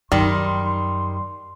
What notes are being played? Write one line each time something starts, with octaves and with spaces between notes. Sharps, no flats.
F#2 D#3 G3 C6